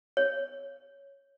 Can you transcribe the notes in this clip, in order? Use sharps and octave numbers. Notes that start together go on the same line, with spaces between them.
C#5